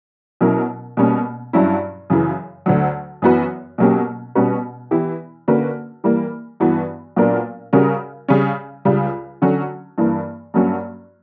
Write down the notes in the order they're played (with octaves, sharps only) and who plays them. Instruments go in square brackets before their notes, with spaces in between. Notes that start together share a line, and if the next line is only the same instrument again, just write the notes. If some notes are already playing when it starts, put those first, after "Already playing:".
[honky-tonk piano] B2 F#3 C#4 E4 A#4
B2 G3 A#3 C#4
G2 F#3 C#4 E4
F#2 C#3 E3
D2 D3 F#3
F#2 E3 B3 F#4 B4
B2 F#3 A#3 C#4 G4
B2 G3 C#4 F#4 B4
E3 B3 E4 G4
D3 A#3 C#4 F#4 B4
E3 G3 A#3
G2 E3 B3 F#4
A#2 F#3 B3 D4 A#4
C#3 G3 C#4 F#4 A#4
C#3 G3 C#4
C#2 C#3 G3
D3 F#3 C#4 F#4
G2 E3 A#3
G2 F#3 A#3 C#4 F#4